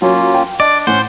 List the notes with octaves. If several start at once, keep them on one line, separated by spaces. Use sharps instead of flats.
F#3 A#3 C#4 F4
G5
D4 D5 D#5
A2 C#4 C5 F#5